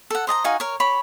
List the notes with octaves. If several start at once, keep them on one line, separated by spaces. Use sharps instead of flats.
A4 F#5
C5 D#5 A5 A#5
D#4 F#4 F5 G#5
A#4 C#5
G4 C#5 B5